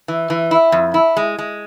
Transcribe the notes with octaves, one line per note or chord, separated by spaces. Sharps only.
E3
E3
E4
F2
E4
G#3
G#3